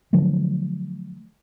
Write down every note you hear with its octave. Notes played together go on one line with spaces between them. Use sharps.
D3 F3 F#3 A3